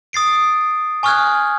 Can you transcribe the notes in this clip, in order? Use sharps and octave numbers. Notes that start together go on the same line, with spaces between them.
D#6 A6 C7 D7
G#5 C#6 D#6 F6 F#6 G#6